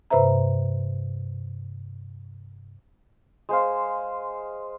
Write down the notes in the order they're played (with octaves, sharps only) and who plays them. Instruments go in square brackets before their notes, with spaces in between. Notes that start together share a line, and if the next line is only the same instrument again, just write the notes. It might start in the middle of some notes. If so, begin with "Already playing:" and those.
[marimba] G2 C3 B4 C5 E5 A#5
[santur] G#3 C5 F5